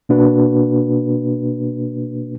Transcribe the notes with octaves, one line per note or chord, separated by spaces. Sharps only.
B2 A#3 D4 F#4 B4